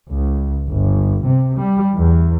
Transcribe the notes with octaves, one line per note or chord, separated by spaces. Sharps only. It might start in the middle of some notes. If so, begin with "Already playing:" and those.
C#2
G1
C3
G3
E2